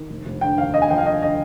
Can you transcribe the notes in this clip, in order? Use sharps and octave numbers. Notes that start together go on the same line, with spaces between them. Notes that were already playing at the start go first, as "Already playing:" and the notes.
Already playing: D#3
F1
F1
D3 G5
D#2 F5
D3 D#5
G#5
F3 G5
F5
D3 D#5
D3 D#5